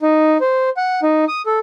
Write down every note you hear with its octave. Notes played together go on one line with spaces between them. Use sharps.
D#4
C5
F#5
D#4
D#6
A4